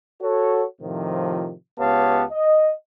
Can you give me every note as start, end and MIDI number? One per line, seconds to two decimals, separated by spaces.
0.21 0.64 66
0.21 0.64 69
0.21 0.64 73
0.81 1.53 45
0.81 1.53 48
0.81 1.53 51
0.81 1.53 53
1.78 2.23 37
1.78 2.23 59
1.78 2.23 67
1.78 2.23 73
1.78 2.23 77
1.78 2.23 81
2.32 2.71 75